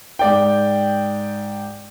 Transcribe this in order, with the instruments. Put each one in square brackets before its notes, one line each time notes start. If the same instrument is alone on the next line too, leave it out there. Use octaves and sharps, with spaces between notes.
[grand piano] G#2 D5 G5